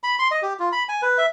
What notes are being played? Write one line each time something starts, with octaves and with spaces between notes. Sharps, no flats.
B5
C6
D#5
G4
F4
B5
G#5
B4
E5